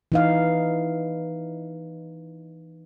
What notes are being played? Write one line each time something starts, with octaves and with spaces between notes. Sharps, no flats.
E3 D#4 F5